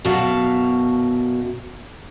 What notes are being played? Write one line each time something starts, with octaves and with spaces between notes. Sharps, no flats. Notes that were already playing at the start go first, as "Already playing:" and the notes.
F#2 B2 F#4 E5 F5 A5